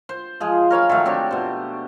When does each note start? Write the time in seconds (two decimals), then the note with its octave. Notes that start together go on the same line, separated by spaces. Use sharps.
0.09 C5
0.40 F3 G#3 G#4
0.70 A#4 C#5 F5 B5
0.89 D#3 F#3 A3
1.06 C4 D4 G4 C#5
1.31 B2 C5